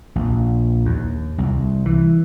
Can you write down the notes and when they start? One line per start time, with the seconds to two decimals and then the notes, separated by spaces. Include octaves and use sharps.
0.16 A#1
0.85 D#2
1.38 C2
1.86 E3